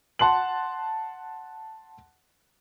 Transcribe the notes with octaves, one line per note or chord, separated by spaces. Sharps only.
F#5 A5 C6 F#6 F#7